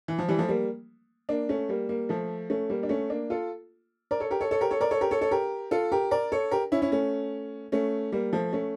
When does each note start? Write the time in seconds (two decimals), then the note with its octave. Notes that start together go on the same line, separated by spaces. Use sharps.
0.08 E3
0.19 F3
0.28 E3 G3
0.39 F3 A3
0.48 G3 A#3
1.29 A#3 D4
1.49 A3 C#4
1.69 G3 A#3
1.89 G3 A#3
2.09 F3 A3
2.50 A3 C#4
2.70 G3 A#3
2.83 D4
2.89 A3 C#4
3.10 A#3 D4
3.30 F4 A4
4.11 A#4 D5
4.20 A4 C#5
4.31 G4 A#4
4.41 A4 C#5
4.51 A4 C#5
4.61 G4 A#4
4.71 A4 C#5
4.81 A#4 D5
4.91 A4 C#5
5.01 G4 A#4
5.11 A4 C#5
5.21 A4 C#5
5.31 G4 A#4
5.71 F4 A4
5.92 G4 A#4
6.11 A#4 D5
6.32 A4 C#5
6.51 G4 A#4
6.72 C#4 E4
6.82 C#4 E4
6.92 A3 C#4
7.72 A3 C#4
8.12 G3 A#3
8.33 F3 A3
8.53 A3 C#4